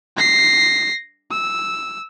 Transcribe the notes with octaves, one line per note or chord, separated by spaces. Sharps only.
A#6 C7
E6